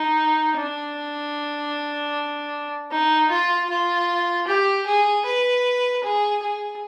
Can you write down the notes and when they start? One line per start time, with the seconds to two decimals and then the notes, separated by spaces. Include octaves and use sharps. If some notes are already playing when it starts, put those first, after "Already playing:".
Already playing: D#4
0.57 D4
2.91 D#4
3.30 F4
3.70 F4
4.47 G4
4.86 G#4
5.25 B4
6.04 G#4
6.42 G#4